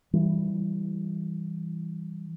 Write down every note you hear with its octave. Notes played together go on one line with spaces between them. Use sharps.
E3 G3